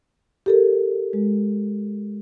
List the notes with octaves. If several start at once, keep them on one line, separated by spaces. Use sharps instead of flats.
G4 A4 A#4
G#3